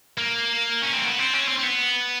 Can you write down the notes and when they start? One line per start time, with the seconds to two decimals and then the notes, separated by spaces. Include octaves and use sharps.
0.18 A#3
0.82 C#4
0.93 C4
1.04 B3
1.19 C4
1.34 C#4
1.49 C4
1.59 C4
1.63 B3